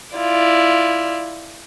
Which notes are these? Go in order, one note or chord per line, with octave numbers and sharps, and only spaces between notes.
E4 F4 D5